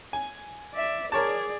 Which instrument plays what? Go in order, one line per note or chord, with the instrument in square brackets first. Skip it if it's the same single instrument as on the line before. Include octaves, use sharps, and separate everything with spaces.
[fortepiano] G#5
[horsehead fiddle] D5 E5
[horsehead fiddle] G#4 D5 [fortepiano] A#4 C#5 A5